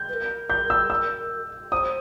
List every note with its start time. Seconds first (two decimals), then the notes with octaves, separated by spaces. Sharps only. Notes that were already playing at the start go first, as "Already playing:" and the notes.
Already playing: G6
0.08 B4
0.13 A#4
0.50 G6
0.70 E6
0.90 E6
1.72 C5 D#6